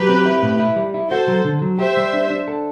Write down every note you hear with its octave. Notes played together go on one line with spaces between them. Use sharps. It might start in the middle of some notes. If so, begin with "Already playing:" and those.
Already playing: F#3 G4 B4
C4
E4
A2
E4
G3
E4
F#4 A4 C5
F#3
D3
F#3
G4 C5 E5
G3
D4
D4
A4